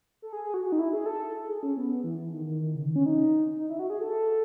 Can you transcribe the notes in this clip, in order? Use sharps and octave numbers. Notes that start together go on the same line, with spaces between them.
A4
G#4
G#4
F#4
F#4
D#4
E4
G#4
A4
G#4
C#4
B3
B3
E3
E3
D#3
D#3
D#3
C#3
D#3
C#4
D#4
D#4
E4
F#4
G#4
A4